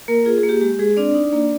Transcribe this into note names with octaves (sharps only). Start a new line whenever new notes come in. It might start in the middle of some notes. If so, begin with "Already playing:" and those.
A#3 A#4
F4 G#4
G#4
A#3
G4
G#3 G4
G#3 G#4
C4 D4 D5
D#4
A#3